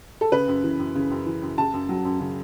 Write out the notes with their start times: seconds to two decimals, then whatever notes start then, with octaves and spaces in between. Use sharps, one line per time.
0.21 A4
0.32 C#3 B4
0.48 F#2
0.64 E3
0.79 F#2
0.95 C#3
1.11 F#2
1.26 E3
1.42 F#2
1.58 C#3 A5
1.74 F#2
1.89 F#3
2.05 F#2
2.20 C#3